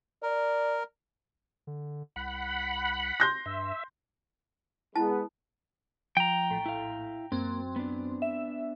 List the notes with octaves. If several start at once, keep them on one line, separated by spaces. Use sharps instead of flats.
A#4 D5
D3
C2 F#5 B5
C6 G6 A#6
G2 E5
G#3 B3 E4 A5
F3 G5 A#5
A#1 A2
E4 F5
F#2 A#3 C4
B3 D4
E5